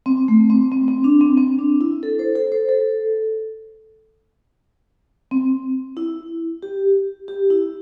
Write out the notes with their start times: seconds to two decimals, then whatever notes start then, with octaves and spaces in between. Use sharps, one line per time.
0.06 C4
0.28 A3
0.50 C4
0.72 C4
0.88 C4
1.04 D4
1.21 C4
1.37 C4
1.59 D4
1.81 E4
2.03 A4
2.19 C5
2.35 A4
2.52 C5
2.69 A4
5.31 C4
5.97 E4
6.63 G4
7.28 G4
7.50 E4